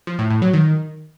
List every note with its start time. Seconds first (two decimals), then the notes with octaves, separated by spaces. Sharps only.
0.07 F3
0.19 A2
0.30 A2
0.42 F#3
0.53 D#3